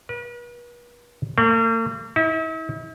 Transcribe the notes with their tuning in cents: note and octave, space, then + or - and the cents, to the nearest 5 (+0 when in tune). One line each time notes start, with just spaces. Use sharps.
B4 -40
A#3 -45
E4 -45